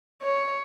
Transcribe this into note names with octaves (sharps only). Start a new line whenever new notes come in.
C#5